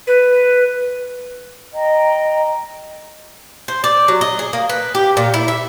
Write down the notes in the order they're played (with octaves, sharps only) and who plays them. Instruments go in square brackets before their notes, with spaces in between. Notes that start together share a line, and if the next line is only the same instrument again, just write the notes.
[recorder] B4
[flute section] D#5 G5 A#5
[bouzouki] C5
D5
F#3
D#5
G#4
A#3
B4
G4
A#2
E4
E5